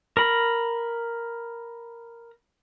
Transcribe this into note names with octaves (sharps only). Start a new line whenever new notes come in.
A#4 B5